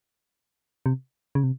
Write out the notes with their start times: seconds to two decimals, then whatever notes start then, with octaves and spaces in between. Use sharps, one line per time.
0.86 C3
1.35 C#3
1.43 C3